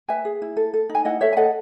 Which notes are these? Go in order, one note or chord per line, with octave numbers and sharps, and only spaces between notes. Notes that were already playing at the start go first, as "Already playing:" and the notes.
B4 E5 G#5
G#4
E4
A4
A4
D#4
G#5
E4 D#5 F#5
A4 C#5 E5
G#5
A4 D#5 F#5